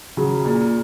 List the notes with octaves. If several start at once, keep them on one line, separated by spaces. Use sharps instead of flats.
C#3 F#3
A#2